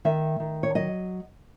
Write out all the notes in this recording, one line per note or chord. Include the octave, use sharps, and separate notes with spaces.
D#3 E5
D#3
C#5
F#3 D#5